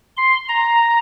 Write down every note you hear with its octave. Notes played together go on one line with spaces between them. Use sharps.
C6
A#5